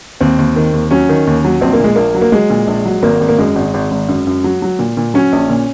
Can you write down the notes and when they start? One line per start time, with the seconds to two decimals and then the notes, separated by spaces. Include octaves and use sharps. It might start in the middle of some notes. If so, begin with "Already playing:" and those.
0.21 D#2 C4
0.38 D#2
0.56 D#3
0.73 D#2
0.91 F#3 C#4
1.09 D#3
1.27 D#2
1.44 F#3
1.61 A#1 C4
1.73 A#3
1.79 A#2 G#3
1.96 A#1 A#3
2.15 F#3
2.21 A#3
2.32 F#3 G#3
2.50 A#2
2.67 A#1
2.85 F#3
3.02 G#1 A#3
3.20 G#1
3.29 A#3
3.38 F#2 G#3
3.56 G#1
3.74 G#1
3.91 G#1
4.08 F#2
4.27 F#2
4.44 F#3
4.62 F#3
4.79 A#2
4.97 A#2
5.14 F#3 C#4
5.33 A#1
5.50 A#2